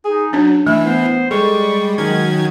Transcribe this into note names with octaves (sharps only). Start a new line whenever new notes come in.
D#4 G#4
F#3 C#4 D4
E3 A3 D4 E4
B3 C5
G3 G#3 A4 C#6
D#3 F#3 C#4 G#6